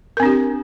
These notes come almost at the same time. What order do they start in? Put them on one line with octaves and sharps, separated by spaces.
A#4 C4 D4 G4